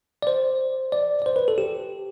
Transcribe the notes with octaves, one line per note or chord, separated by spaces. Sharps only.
D5
C5
D5
D5
C5
B4
A4
G4